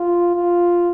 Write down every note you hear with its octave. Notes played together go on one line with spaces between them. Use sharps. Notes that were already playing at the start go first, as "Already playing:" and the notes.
Already playing: F4
F4